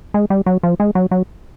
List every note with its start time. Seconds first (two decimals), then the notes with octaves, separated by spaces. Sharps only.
0.14 G#3
0.30 G3
0.46 F#3
0.63 F3
0.80 G#3
0.95 F#3
1.11 F#3